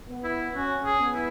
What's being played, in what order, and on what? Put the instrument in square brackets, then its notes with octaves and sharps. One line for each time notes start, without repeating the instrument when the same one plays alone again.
[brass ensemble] B3
[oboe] E4
[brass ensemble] C#4 [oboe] F#4
[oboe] G#4
[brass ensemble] B3
[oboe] E4